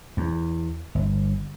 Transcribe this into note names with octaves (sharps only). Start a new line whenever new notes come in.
E2
G1